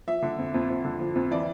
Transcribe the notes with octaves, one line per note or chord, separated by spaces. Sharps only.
F3 E5
D3
F2
F2
F2
D3
F3
F2
E3 D5